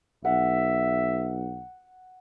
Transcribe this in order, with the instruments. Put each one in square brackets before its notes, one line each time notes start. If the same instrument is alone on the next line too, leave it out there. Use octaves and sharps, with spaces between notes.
[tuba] B1 [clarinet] E5 [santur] F#5